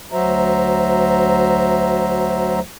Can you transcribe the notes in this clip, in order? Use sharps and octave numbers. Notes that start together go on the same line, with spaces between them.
D2 F#3 F#4 C5 E5 A#5